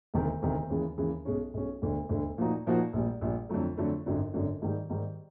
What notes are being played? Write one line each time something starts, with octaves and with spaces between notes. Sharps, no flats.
E1 D2 C3 D#3
E1 D2 C3 D#3
D#2 C#3 E3 G#3
D#2 C#3 E3 G#3
B1 B2 G#3 C#4
B1 B2 G#3 C#4
E1 D2 D3
E1 D2 D3
A#2 F3 A#3 D#4 F#4
A#2 F3 A#3 D#4 F#4
A#1 A#2 G3
A#1 A#2 G3
F2 D3 F#3 A3
F2 D3 F#3 A3
G#1 F#2 D3 F#3
G#1 F#2 D3 F#3
G#2 D#3 G3
G#2 D#3 G3